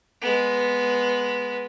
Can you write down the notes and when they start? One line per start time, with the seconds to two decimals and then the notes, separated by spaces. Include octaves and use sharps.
0.21 G#3 B3